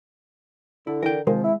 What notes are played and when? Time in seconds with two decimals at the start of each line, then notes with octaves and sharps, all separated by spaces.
0.87 D3 E4
1.03 E3 A#4 G5
1.27 C3 D#3 F3 G#3 C4
1.44 E4